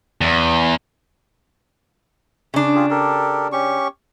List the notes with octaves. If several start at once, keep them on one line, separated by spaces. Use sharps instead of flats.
E2
C#3 D4
F4 G4 G#4
G4 A4 A#4
C#4 G4 C#6